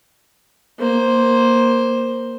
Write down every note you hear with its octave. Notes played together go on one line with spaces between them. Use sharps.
A#3 C5